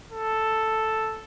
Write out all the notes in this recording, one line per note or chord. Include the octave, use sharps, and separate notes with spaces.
A4